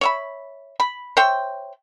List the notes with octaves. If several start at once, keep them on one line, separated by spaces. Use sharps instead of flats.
C#5 E5 B5
B5
C5 C#5 E5 G5